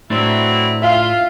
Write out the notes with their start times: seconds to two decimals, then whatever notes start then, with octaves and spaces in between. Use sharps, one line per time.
0.10 A2 F#3 A3 C4 D4 E4
0.82 F4 E5 F5